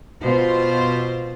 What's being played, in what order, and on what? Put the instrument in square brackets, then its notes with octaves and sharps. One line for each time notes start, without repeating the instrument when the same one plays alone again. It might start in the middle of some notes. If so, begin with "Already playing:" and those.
[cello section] B2 F4 C5